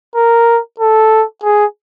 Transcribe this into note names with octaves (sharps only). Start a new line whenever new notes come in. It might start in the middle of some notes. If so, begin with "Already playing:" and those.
A#4
A4
G#4